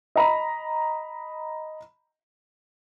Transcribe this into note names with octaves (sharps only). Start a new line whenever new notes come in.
D#5 A#5 B5